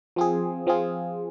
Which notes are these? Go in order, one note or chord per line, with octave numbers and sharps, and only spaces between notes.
F3 C4 F4 G#4
F3 C4 F4 G#4